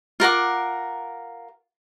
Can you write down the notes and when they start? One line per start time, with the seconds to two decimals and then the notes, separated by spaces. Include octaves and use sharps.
0.20 F4 A#4 F#5 D6